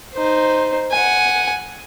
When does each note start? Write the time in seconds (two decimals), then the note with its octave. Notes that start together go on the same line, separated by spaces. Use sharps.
0.14 D#4 C5
0.91 F#5 G#5